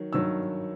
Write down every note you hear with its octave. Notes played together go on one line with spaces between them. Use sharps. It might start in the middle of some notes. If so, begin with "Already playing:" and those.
Already playing: D#3 F#3
G2 D#3 F#3 E6